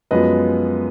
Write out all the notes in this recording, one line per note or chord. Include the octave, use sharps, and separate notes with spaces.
F#2 F3 G#3 B3 B4 D#5